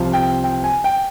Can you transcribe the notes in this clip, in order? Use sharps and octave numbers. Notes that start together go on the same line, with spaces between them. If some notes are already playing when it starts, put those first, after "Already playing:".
Already playing: C2 C3 F3
G5
G5
G#5
G5